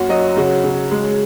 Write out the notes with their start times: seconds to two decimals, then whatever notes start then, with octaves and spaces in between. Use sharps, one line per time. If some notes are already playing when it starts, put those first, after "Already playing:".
Already playing: F#2 A#3 F#4
0.09 F#3 D#5
0.37 C#3 F#4
0.64 C#3
0.91 G#3